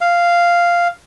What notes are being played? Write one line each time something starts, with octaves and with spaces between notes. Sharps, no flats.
F5